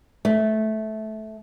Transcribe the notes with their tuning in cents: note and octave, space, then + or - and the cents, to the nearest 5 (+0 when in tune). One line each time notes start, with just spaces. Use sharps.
A3 -15